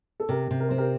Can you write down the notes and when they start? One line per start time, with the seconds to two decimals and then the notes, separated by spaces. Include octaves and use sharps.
0.20 A4
0.29 C3 G4 A#4
0.51 C3
0.60 A#4
0.69 C4 C5
0.78 G4 A#4